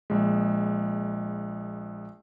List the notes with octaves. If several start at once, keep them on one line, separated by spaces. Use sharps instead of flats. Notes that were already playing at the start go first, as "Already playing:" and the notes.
A#1 G#3